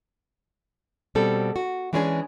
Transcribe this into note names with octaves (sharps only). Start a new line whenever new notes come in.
B2 G3 C4 A4
F#4
E3 G#3 C#4 D4 G4 G#4